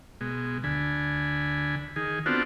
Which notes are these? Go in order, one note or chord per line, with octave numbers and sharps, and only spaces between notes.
B2 G#3
D2 D3 G#5 B5
D#3 G#4
B3 C4 D4 F4 F#4 A4